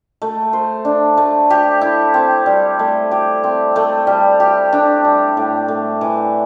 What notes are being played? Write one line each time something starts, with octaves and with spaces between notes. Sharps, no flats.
A3
C5
D4
A3
G4
E4
C4
G3
A3
G4
C4
A3
G3
G4
D4
G3
A2
A3
E3